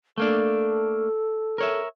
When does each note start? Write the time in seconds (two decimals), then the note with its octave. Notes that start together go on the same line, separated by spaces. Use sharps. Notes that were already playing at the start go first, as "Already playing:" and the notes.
0.18 A3 A#3 D4 A4
1.58 A#4 C#5 E5